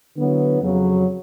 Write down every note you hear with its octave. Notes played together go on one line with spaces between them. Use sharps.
D3 F#3 B3 E4
F2 C#3 F#3